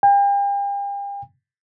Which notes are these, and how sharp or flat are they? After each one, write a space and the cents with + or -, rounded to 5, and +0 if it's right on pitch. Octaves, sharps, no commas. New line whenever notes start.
G5 +40